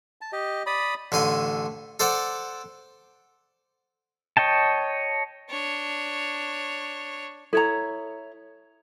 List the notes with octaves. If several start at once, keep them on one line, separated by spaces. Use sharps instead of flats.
A5
G4 D#5
D5 B5 D#6
A1 D3 G#5 C6
A4 C5 D5 F#5
C#5 D#5 G5 A5
D4 C#5
E4 A4 C#5 A#5